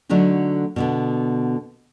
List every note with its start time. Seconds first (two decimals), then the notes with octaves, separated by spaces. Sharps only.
0.09 D3 F#3 A3 D4 D#4
0.76 B2 D3 B3